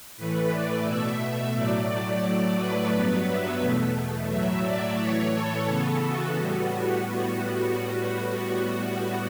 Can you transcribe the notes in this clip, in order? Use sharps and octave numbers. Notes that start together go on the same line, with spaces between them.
A2 E3 A3 B4
D5
B2 A3 E5
A2 F#3 A3 D5
D5
A2 F#3 A3 D5
B4
G2 F#3 B3 B4
E5
E2 B2 A3
A2 F#3 A3 E5
D5
A2 E3 A3 C#5
A4
C#3 E3 B3 A4
F#4
A2 G3 B3